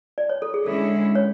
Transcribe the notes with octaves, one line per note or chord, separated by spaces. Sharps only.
D5
C#5
A4
G#4
D3 G#3 C#4 E4 A4
C#5